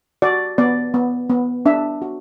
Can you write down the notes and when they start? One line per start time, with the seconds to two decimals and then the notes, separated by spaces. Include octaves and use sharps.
0.22 F#4 D5
0.58 B3 D5
0.94 B3
1.30 B3
1.66 D4 E5
2.02 F#4